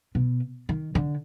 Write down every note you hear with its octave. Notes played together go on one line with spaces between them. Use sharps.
B2
D#3
D3